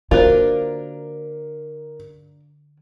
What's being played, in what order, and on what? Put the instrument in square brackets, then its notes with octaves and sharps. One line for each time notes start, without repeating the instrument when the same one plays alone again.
[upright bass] D3 [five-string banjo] A#3 D4 F4 [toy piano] F#4 C5 [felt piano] A#4